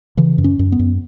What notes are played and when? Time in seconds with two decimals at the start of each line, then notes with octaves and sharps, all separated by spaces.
0.17 C#3 E3
0.38 F#2
0.44 C#4
0.59 F#2
0.72 B3
0.79 F#2